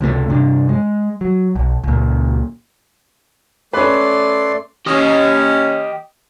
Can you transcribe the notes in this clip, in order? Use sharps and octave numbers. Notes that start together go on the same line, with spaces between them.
C#2 C3 G3 A3
G2 C3 D4
G#3
F#3
B1
C#2 A#2
A3 C#4 B4 D5 C6
C#4 G4 D#5